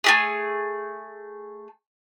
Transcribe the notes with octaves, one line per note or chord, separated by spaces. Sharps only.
A3 G4 G#4